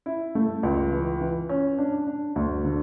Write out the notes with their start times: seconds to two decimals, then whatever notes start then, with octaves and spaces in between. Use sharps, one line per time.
0.06 E4
0.35 A3
0.63 C#2
0.92 E3
1.21 E3
1.49 C#4
1.78 D4
2.07 D4
2.36 D2
2.65 D3